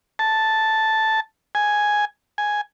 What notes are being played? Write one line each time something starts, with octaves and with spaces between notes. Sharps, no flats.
A5
G#5
G#5